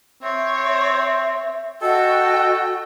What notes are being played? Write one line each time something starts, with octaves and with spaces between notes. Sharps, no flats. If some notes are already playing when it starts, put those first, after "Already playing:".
C4 C#5 E5
F#4 A4 D#5 G5